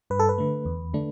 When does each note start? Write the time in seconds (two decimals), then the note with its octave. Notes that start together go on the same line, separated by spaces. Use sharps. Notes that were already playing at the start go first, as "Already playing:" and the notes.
0.10 G2 B4
0.19 A4
0.29 B4
0.38 D3 A3
0.65 E2
0.94 D3 A3 D4